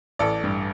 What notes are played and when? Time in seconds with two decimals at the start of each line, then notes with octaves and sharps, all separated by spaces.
0.19 A1 A4 D5
0.44 G2